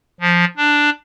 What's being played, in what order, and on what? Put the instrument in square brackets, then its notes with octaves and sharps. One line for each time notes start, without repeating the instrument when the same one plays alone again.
[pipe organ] F3
D4